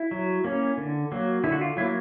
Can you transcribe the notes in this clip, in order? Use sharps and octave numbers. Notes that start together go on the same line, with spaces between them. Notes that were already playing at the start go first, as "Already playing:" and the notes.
Already playing: E4
F#3
A#3 C#4
D3
F#3 A#3
D3 E4
F#4
F4
F#3 A#3 E4